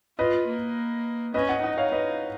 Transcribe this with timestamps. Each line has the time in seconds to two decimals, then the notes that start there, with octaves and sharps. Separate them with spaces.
0.18 F4 B4 D#5
0.47 A#3
1.34 C#4 B4 D#5
1.49 D#5 F#5
1.63 D#4 D#5 F#5
1.77 C#5 F5
1.92 B4 D#5